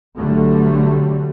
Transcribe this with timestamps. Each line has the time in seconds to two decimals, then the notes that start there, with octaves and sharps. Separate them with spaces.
0.17 B1 D3 F#3 G3 A3